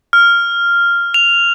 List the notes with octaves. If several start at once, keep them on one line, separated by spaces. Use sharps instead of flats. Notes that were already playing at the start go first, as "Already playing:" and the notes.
F6
F7